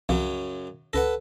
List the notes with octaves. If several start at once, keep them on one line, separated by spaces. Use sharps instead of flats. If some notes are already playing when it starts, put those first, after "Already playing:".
C2 F#2 C#3 F3 F#3
C#2 A4 B4 F#5 A#6